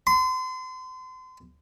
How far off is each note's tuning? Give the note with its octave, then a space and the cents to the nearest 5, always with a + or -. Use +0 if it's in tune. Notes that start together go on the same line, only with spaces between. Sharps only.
C6 -35